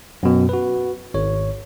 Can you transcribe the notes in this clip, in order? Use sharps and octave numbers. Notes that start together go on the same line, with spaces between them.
F#2 B2
F#4 B4
G#1 C#5